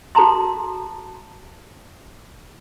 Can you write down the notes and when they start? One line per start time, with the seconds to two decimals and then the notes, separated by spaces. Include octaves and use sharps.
0.15 F#4 A4 A5 A#5 C6